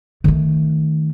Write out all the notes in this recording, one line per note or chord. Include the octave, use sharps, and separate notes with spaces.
D#3 A3